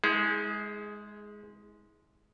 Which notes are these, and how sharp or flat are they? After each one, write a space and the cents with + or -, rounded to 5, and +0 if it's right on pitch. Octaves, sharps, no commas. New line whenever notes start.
G#3 +0 E4 -45 G#4 +10